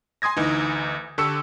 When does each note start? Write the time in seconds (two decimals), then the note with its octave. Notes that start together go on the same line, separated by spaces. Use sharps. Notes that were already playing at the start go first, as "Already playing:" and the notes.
0.22 G#5 C6 D#6 G#6 A#6
0.37 D2 E3 D#4
1.18 D3 G4 A4 C#6 E6 C#7